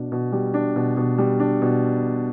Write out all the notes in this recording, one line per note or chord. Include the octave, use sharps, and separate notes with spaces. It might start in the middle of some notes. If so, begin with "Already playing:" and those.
Already playing: B2 D4
B2
G3
D4
B2
B2
G3
D4
B2